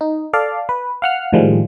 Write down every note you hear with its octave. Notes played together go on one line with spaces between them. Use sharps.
D#4
A4 D5 F5
B4
F5 F#5 F6
A2 D#3 F3 G3 G#3